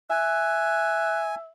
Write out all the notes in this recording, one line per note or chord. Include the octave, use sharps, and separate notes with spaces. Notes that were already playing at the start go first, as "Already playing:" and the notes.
E5 G#5 F#6